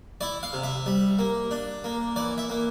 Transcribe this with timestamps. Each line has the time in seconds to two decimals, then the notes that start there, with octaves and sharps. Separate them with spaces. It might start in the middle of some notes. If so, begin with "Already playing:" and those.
0.21 E4 D5
0.43 F5
0.53 C3
0.63 E5
0.86 G3
1.19 A#3
1.51 D4
1.84 A#3
2.16 E3 D5
2.38 E5
2.50 A#3